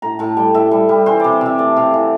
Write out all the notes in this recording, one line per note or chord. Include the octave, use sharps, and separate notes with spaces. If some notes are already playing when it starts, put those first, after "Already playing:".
A2 A#5
A2 A5
G3 G5
A2 E5
G3
G3
E3 C5
C3 D5
C3 E5
A3 D5
C3 F5
E3 E5